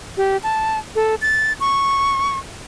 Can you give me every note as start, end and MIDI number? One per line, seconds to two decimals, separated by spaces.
0.17 0.37 67
0.43 0.79 81
0.96 1.15 69
1.22 1.53 93
1.60 2.39 85